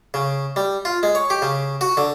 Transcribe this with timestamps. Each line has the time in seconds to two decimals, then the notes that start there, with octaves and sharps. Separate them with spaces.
0.14 C#3
0.56 G3
0.85 F4
1.03 G#3
1.15 C#5
1.30 G4
1.42 C#3
1.81 F#4
1.97 D3